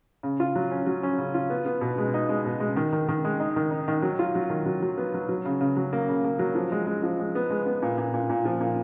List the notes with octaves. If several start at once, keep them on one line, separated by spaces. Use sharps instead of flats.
C#3
F4
F#3
C#4
F#3
C#4
C#3
F4
B3
B3
B2
G#3
D#4
G#3
B2
G#3
D#3
D#3
D#3
G#3
D#4
D#3
D#4
D#3
F#3
F4
F#3
D#3
F#3
F#3
B3
F#3
F#3
C#3
C#3
F#3
A#3
C#3
A#3
F#3
F3
G#3
G#3
F3
G#3
B3
G#3
B3
A#2
A#2
A#2
A#2
F3
A#2